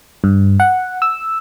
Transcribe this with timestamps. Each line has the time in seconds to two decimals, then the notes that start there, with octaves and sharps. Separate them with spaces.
0.24 G2
0.60 F#5
1.02 E6